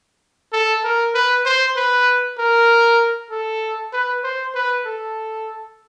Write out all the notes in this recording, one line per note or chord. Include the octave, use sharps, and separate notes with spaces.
A4
A#4
B4
C5
B4
A#4
A4
B4
C5
B4
A4